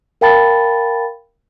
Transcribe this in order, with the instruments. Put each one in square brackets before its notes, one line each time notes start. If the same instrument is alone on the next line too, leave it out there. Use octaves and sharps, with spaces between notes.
[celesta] A#4 F5 G5 A5 B5 A6